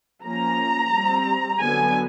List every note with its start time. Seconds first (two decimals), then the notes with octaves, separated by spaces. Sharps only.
0.24 F3 A#3 C#4 A#5
0.93 G3 C4
1.61 D3 F#3 B3 G#5